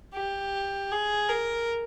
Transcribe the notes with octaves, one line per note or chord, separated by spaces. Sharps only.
G4
G#4
A#4